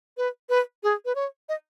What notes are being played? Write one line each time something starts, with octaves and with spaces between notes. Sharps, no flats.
B4
B4
G#4
B4
C#5
D#5